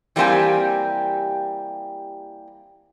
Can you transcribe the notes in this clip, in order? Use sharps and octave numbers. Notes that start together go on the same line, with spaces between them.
E3 G3 A#3 C4 G4 G#5